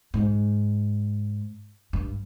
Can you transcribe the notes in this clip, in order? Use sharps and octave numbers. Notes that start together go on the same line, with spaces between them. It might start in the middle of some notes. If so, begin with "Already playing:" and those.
G#2
G2